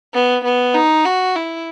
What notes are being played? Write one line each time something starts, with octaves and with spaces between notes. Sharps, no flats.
B3
B3
D#4
F#4
E4